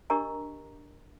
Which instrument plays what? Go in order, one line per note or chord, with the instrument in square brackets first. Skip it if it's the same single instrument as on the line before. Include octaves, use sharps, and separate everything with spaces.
[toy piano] D4 G4 A#4 D#5 A#5 C#6